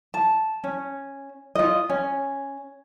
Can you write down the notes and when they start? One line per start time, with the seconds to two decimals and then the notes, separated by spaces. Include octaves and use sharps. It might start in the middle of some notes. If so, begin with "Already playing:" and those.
0.14 A5
0.64 C#4
1.55 F4 D#5
1.90 C#4